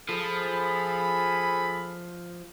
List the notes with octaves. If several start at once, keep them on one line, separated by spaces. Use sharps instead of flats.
F3 G#4 A4 B5